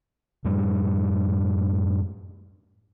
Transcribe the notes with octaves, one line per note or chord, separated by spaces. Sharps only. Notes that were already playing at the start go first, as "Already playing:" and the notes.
F#2 A2 G3